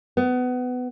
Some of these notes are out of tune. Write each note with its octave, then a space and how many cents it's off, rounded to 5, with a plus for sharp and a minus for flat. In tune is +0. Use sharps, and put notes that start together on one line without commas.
B3 +20